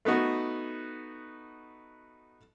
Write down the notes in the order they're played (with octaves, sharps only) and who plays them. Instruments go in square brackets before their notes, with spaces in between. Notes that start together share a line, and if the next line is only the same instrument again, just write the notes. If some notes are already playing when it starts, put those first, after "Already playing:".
[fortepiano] A3 B3 D#4 F#4